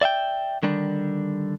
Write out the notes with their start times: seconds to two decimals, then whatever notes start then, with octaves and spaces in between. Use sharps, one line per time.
0.01 D5 E5 F5 G5
0.63 D3 D#3 G3 D4